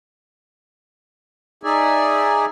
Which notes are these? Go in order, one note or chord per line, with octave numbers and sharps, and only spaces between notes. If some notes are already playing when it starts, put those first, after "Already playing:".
D#4 G#4 D5 E5 G#5